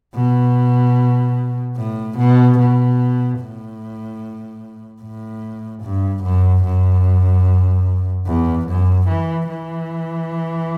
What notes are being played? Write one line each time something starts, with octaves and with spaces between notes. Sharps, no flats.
B2
A2
B2
B2
A2
A2
G2
F#2
F#2
E2
F#2
E3
E3